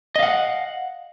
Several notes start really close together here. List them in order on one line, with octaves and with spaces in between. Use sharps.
D#5 F5 F#5